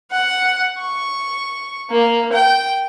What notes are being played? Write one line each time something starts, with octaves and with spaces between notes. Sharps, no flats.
F#5
C#6
A#3
G5